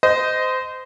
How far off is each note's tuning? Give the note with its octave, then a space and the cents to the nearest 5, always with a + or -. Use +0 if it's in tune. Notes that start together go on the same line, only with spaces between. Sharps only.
C5 -25 D#5 +0